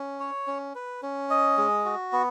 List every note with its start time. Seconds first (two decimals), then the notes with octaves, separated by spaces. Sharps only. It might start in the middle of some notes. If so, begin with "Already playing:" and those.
Already playing: C#4
0.20 C#5
0.47 C#4
0.75 B4
1.03 C#4
1.30 D#5
1.58 G#3
1.85 F#4
2.13 B3